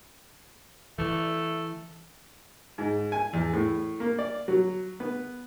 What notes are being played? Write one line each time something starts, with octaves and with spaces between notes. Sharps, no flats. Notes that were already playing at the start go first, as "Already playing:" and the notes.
E3 A3
G#2
G#5
E2
A2
A#3
D5
F#3
B3